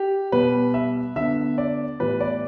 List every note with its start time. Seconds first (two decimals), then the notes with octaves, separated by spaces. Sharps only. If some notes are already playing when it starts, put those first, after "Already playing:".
Already playing: G4
0.32 B2 G3 B3 B4
0.74 E5
1.16 D3 B3 E5
1.58 D5
2.00 A2 E3 G3 B3 B4
2.21 D5